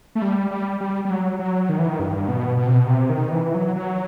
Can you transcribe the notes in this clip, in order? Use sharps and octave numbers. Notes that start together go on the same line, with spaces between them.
A3
G3
G3
G3
G3
F#3
F#3
D#3
E3
D#3
G2
B2
B2
C3
B2
C3
D#3
E3
F#3
F#3